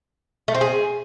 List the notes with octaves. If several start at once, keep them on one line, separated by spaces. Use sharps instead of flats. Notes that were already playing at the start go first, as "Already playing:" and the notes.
A3
C4
G#4